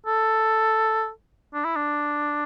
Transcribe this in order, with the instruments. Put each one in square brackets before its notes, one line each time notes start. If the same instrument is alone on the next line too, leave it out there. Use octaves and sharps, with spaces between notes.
[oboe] A4
D4
E4
D4